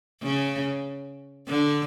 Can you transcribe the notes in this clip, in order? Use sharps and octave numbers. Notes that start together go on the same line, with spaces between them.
C#3
D3